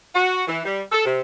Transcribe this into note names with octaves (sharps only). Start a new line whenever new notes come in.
F#4
E3
G3
A4
C3